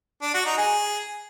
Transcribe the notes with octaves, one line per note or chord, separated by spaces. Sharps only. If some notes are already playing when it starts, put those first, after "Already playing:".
D4
F#4
D#4
G#4